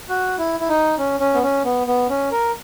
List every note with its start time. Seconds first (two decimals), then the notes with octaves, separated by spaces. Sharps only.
0.09 F#4
0.38 E4
0.60 E4
0.68 D#4
0.98 C#4
1.20 C#4
1.34 B3
1.42 C#4
1.65 B3
1.87 B3
2.09 C#4
2.31 A#4